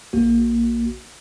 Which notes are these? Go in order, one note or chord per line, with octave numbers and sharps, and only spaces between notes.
A#1 A#3 F#4